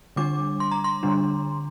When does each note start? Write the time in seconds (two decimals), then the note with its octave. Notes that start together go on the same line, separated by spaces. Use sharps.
0.16 D3 G3 D4 D6
0.60 C6
0.71 A#5
0.84 C6
1.03 D3 G3 D4